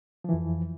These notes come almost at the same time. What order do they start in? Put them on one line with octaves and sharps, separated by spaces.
F3 E3 F2